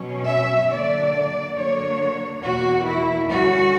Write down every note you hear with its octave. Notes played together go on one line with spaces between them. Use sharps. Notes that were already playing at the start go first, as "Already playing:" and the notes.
Already playing: B2 F#3 C#4
E5
D3 F#3 A#3 D4 D5
D3 F#3 A#3 D4 C#5
E2 B2 A#3 F#4
E4
D3 G3 C#4 F#4